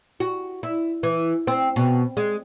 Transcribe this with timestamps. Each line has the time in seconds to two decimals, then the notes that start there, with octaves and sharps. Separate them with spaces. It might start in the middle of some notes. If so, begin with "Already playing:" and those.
0.20 F#4
0.63 E4
1.03 E3
1.47 C4
1.76 B2
2.17 G#3